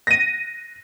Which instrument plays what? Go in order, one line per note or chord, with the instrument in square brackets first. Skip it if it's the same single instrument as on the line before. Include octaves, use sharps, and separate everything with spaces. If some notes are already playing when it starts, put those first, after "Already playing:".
[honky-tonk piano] A#6 D#7